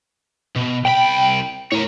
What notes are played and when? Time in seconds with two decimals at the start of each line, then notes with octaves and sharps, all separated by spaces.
0.56 B2
0.85 C2 G5 B5
1.72 A2 A#4 C#5